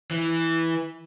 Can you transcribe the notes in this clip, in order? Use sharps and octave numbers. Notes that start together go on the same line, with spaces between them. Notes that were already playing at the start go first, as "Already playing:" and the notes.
E3